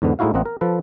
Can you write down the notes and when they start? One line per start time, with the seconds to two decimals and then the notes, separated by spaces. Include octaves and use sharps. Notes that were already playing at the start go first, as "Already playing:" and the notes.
0.02 E2 G#2 D3 B3
0.19 A2 G#3 D#4 E4 F#4 F5
0.34 A1 A#3 C4 D#5 F#5
0.45 A#4
0.61 F3 A4 B4